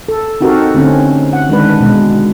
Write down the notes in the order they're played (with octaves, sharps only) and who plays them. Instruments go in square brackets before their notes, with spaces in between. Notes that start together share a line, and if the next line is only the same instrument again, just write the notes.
[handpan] A4
C4 D#4 F#4 G4 A4 A#4
D3 A3 C4 C#4
F#5
D#3 G#3 D4 B4
B2 G#3